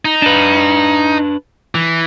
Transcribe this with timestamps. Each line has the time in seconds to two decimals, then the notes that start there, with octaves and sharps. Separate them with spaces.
0.05 D#4
0.22 D4 B4
1.75 E3